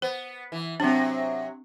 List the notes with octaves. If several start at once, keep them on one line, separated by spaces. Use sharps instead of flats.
B3 C5
E3
C3 F#3 C4 D4